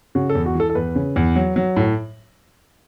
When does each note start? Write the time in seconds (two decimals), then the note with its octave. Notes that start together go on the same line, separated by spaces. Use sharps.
0.15 C#3 F#4
0.30 A4
0.35 E2
0.46 F#4
0.55 E3 A4
0.70 A4
0.75 E2 B4
0.95 C#3
1.16 E2
1.36 F#3
1.56 F#3
1.76 A2